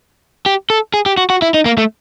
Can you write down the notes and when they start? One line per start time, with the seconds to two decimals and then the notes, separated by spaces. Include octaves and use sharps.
0.46 G4
0.70 A4
0.94 G#4
1.06 G4
1.17 F#4
1.30 F#4
1.42 E4
1.54 D#4
1.66 A#3
1.78 A3